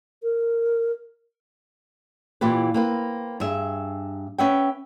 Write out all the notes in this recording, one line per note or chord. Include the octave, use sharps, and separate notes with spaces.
A#4
A#2 E3 F4 G4 B4
A#3 C4 B4
G2 G#4 E5
C#4 B4 E5 F#5 G5